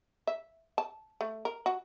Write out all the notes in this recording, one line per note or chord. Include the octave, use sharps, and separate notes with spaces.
E5
A5
A3
A#4
F#4